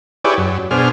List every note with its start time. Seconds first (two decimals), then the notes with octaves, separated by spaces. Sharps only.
0.24 E4 G4 G#4 B4 C#5 D5
0.37 F#2
0.71 B2 D4 G#4 C5 F6